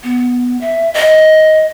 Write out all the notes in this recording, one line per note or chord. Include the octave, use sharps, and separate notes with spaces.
B3
E5
D#5